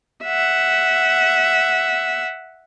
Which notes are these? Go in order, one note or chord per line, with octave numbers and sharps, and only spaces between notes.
E5 F#5